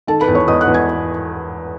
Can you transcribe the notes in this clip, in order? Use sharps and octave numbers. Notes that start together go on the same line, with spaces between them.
D#3 A4 A5
B4 B5
E2
C#5 C#6
E2 D#5 D#6
F#5 F#6
E2
G#5 G#6